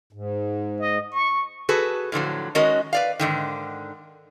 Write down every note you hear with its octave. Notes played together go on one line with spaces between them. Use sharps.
G#2
D#5
C#6
F#4 G#4 A4 B4
A2 D3 F3 F#3
D#3 G#3 C#4 F#4 A#4 D#5
B4 D5 F5
G#2 D3 D#3